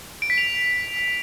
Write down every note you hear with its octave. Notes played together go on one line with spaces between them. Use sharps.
D7
B6
F7